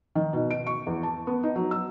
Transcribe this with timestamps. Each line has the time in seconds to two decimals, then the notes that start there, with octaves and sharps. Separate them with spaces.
0.15 D#3
0.33 B2
0.51 D7
0.67 C#6
0.87 E2
1.03 A5
1.27 B3
1.43 D#4
1.56 F#3
1.71 E6